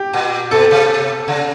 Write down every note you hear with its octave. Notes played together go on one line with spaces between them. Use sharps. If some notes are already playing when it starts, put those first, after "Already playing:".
Already playing: G4
A#2
B2 A4
C3
C#3